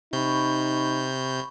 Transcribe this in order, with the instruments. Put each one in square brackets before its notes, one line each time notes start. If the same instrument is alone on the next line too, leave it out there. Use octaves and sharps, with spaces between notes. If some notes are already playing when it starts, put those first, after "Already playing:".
[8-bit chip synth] C3 G6 [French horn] D#4 [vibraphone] B5 C#6